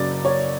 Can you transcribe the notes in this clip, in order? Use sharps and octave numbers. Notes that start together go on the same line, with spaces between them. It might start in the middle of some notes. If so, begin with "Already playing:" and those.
Already playing: F#1 C#3 F#3 D5
C#5